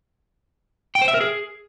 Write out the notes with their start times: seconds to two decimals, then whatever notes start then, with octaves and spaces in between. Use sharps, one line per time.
0.95 G5
1.02 C5
1.08 E5
1.14 A#4
1.21 G#4